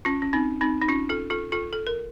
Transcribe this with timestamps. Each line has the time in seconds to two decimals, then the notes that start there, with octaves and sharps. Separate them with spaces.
0.05 C#4 F4
0.22 C#4
0.33 C4 D#4
0.61 C4 D#4
0.82 D#4
0.88 C#4 F4
1.09 F4 A4
1.30 F4 A4
1.52 F4 A4
1.73 A4
1.87 A#4